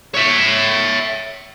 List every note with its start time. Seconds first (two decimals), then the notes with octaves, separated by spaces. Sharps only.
0.14 C#5 E5